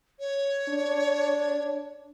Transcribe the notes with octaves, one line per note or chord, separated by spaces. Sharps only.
C#5
D4